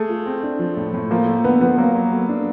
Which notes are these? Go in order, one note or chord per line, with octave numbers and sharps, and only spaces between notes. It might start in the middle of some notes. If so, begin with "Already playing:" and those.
Already playing: A3 G#4
F4
C4
D4
F3
A2
A2
F3 A#3
A3
D3 B3
F3 B3
F#3 A#3
F#3
A3
D4